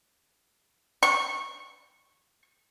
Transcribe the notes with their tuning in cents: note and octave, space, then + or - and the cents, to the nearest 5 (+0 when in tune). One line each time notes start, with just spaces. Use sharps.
C#6 -15